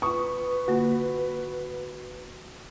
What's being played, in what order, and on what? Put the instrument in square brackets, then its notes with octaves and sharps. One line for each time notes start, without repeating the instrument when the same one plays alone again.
[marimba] F4 D#6 [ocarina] B4 [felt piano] C#6
[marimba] D3 A#3 F4 [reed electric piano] F#4